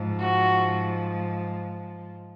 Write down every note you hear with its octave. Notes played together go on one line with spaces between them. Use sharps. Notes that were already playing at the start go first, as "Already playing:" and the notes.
Already playing: G#2 F3
F#4